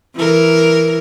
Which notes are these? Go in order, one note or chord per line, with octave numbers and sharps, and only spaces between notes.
E3 A#4